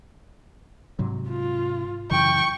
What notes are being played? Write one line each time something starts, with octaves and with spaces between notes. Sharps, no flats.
G#2 C3 F#3
F4
F#2 C#3 E3 G5 C#6